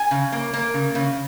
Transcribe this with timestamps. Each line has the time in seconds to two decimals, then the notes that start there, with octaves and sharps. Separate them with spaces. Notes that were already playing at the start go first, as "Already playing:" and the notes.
Already playing: G#5
0.11 C#3
0.32 A#3
0.53 A#3
0.74 C#3
0.95 C#3